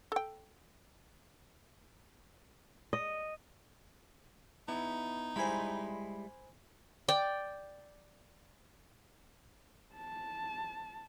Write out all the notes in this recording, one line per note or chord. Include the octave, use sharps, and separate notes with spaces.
A4 G5
D#5
B3 D#4 E4
G3 G#3 E4 C5 G#5 B5
D5 G5
A5